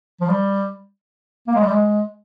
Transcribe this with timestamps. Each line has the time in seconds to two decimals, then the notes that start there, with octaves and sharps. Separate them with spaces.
0.21 F3
0.29 G3
1.47 A#3
1.55 G#3
1.63 G3
1.71 G#3